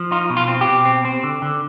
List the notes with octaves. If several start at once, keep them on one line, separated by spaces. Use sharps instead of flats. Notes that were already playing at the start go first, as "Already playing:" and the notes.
Already playing: F3
D#4 F4
B2
F4
C4
G4
B2
C4
C4
D3
D3